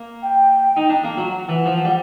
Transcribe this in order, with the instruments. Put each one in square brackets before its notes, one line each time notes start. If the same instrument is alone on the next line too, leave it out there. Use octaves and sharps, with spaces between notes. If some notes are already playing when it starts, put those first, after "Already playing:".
Already playing: [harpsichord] A#3
[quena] G5
[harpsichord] D#4
D4
A#3
F#3
[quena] F#5
[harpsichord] E3
F3
G3